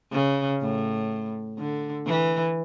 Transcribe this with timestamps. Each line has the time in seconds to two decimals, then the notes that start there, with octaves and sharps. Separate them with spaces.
0.12 C#3
0.61 A2
1.58 D3
2.07 E3